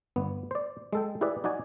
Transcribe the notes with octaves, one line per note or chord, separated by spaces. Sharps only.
G1 B3
C5 D5
G#3 A4 G5
E4 G4 G#4 B4 D5
D#4 F#4 D5 G#5